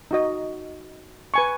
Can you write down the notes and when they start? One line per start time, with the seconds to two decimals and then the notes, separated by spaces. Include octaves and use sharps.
0.11 D#4 F#4 D#5
1.34 B4 G#5 C#6